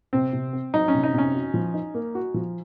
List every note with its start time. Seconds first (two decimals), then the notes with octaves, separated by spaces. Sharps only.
0.13 C3 C4
0.33 C3
0.53 C4
0.74 F#3 D#4
0.88 C#4
0.94 C3
1.04 D#4
1.14 C3 C#4
1.35 F#4
1.54 F3
1.74 D#4
1.95 A#3
2.15 F#4
2.34 F3